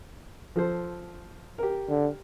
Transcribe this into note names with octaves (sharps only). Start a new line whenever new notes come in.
F3 A4 C5
G4 A#4
D3